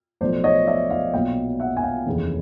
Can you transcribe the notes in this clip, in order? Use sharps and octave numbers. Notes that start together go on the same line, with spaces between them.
B1 A2 F3 C5 D5
C#5 D#5
D5 E5
D#5 F5
B1 A#2 F#3 F5 G5
E5 F#5
G#5
F5 G5
F1 D#2 C#3 E3